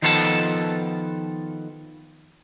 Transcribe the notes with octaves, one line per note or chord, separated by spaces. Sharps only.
D#3 F3 B3 A4 C#5 A5